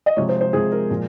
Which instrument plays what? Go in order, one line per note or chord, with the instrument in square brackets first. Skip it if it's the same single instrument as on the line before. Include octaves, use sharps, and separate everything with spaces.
[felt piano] D#5
C3 F3 G#3 C#5
C5
C5
C3 F3 G#3 G#4
A#4
A#2 F3 G#3